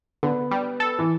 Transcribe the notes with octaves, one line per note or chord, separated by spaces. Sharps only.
D3 B3
G3
A4
E3